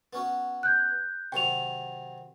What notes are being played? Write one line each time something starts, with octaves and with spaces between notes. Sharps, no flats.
B3 C#4 F#4
F#6 G6
C3 D#3 F#3 G5 F7